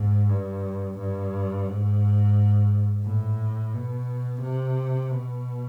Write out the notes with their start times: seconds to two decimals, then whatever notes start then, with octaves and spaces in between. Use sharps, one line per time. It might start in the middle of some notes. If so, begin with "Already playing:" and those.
Already playing: G#2
0.30 G2
0.99 G2
1.67 G#2
3.04 A2
3.74 B2
4.42 C3
5.11 B2